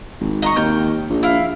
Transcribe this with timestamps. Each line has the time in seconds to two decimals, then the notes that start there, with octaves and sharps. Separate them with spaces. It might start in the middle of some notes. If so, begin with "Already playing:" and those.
0.20 G#1
0.42 D#5 A#5 C#6
0.56 D#2 G5 F6
1.10 A#1
1.23 E4 F5